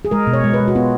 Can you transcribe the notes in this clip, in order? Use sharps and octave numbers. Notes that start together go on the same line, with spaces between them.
G#4
G#3 A#4
B2
C#5
G#3
B4
G#3
F#4
B3 F4